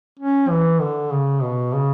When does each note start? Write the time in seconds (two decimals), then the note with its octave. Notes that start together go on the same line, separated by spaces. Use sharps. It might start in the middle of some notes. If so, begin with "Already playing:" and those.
0.19 C#4
0.50 E3
0.81 D3
1.12 C#3
1.42 B2
1.73 C#3